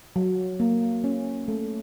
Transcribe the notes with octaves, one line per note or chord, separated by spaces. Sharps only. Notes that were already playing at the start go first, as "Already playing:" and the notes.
F#3
A#3
C#4
A3